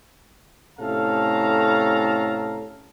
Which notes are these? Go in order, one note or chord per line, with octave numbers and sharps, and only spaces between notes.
A2 C3 C#4 A4 F5 A#5